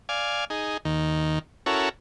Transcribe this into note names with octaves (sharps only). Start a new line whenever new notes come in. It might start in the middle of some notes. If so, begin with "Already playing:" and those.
D5 F5 G#5
D#4 G#4
D#2 D#3
C#4 E4 F#4 A4 A#4